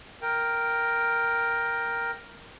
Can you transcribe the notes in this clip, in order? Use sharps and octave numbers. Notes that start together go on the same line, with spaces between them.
A#4 G5